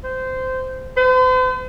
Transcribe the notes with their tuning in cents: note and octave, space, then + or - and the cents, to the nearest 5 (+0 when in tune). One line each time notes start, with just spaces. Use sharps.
C5 -15
C5 -45